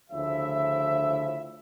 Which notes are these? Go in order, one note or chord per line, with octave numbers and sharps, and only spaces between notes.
D2 C#3 F3 E4 E5